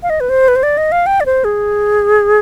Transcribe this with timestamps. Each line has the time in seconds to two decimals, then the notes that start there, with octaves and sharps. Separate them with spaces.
0.03 F5
0.10 D#5
0.20 B4
0.29 C5
0.48 B4
0.56 C5
0.63 D5
0.77 D#5
0.92 F5
1.06 G5
1.20 D5
1.26 C5
1.44 G#4